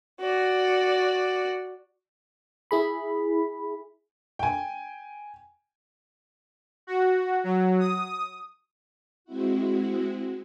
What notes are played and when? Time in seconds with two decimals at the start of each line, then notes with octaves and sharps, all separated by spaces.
0.21 F#4 D5
2.71 E4 G#4 B5
4.39 G5 G#5
6.87 F#4
7.44 F#3
7.80 D#6
9.25 G#3 C4 E4 F#4